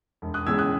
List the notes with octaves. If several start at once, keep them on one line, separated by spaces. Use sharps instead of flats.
E1
D#6 F#6
E2 C#3 G#3 E6 G#6
D#6 F#6